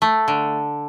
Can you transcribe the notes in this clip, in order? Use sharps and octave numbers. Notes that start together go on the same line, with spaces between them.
A3
D3